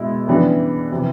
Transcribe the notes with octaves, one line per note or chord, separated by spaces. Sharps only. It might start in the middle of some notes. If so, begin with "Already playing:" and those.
Already playing: B2 G#3 B3 E4
C#3 E3 G3 B3 D4
C3 E3